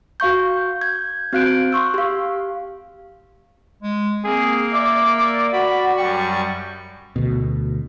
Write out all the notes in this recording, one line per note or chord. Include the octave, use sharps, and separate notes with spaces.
F#4 F5 C#6 G6
G6 G#6
C4 F#4 F5 F#6 G6 D7
C6 C#6 E6
G4 F5
G#3
A#3 C4 G#4
D5 E5 D6
F#4 F#5 B5
F#2 G3 G5 C#6
D2 B2